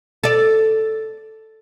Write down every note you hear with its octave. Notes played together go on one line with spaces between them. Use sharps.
A4 D5